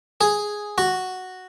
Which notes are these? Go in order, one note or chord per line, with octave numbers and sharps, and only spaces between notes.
G#4
F#4